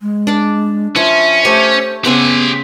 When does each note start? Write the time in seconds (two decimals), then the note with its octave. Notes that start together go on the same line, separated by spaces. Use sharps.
0.02 G#3
0.27 D4 D5
0.96 F3 C#4 E5
1.45 A3 G4 C5 C#5
2.05 C#3 B3 C4 G4 F#5 G#5